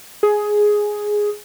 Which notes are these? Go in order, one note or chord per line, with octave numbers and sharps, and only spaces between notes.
G#4